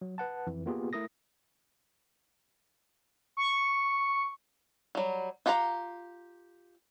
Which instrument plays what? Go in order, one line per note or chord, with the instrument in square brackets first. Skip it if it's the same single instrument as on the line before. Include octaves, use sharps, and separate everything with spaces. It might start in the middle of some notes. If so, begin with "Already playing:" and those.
[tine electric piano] F#3
B4 F#5 A5
F2 E3
A#3 B3 F4 G4 G#4
A3 E4 A#4 D#6 A#6
[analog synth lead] C#6
[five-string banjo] F#3 G3
F4 G4 F#5 A5 A#5